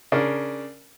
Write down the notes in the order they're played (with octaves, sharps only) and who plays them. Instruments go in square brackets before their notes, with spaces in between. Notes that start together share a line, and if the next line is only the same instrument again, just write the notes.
[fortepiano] C#3 D4 A#4